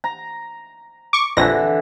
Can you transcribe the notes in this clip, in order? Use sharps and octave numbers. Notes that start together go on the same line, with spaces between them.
A#5
C#6 D6
A#1 F2 D3 E3 A#6